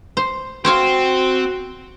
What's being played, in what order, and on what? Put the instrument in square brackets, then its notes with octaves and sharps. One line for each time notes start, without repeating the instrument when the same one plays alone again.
[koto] C5
[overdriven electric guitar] C4 [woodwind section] F#4 [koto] C5 C#5 F5